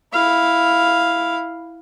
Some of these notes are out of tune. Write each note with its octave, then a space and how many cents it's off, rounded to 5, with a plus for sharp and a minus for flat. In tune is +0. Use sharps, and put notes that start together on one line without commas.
E4 +0 F5 +0